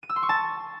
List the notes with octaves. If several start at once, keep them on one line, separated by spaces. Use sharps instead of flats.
D#7
E6
C6
C#6
A5